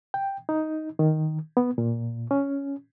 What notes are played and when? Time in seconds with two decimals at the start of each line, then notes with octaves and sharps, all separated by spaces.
0.14 G5
0.49 D#4
0.99 D#3
1.57 B3
1.78 A#2
2.31 C#4